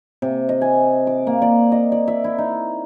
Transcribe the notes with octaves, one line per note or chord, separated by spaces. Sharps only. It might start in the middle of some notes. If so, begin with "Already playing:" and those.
C3
D#5
G#5
D6
A#3
D5
D#5
D5
E5
E4
D#4